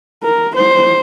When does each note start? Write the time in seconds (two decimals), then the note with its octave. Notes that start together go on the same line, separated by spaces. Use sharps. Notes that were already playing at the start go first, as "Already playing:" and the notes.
0.23 A#4
0.56 C5